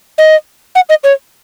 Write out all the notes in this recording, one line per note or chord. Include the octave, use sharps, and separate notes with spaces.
D#5
F#5
D#5
C#5